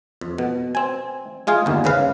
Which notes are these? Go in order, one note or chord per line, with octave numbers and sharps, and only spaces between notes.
F2
B2
C4 G#5
G#3 F4 G#4 F5
G1 D#2
G#2 C#3 B4 F5